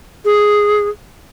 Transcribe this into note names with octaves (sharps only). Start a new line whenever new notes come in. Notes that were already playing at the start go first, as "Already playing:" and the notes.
G#4